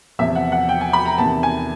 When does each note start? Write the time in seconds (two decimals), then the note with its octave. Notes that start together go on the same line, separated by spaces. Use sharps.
0.19 E2 C3 F3 E5
0.35 F#5
0.52 F#5
0.69 G5
0.81 G#5
0.93 B5
1.06 A#5
1.18 E2 C3 D#3 A5
1.43 G#5